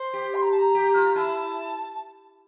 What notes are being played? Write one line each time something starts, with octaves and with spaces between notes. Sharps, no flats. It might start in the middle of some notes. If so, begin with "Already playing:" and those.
Already playing: C5
G4
C6
A#5
A5
A#5
G4
F4
E4 A5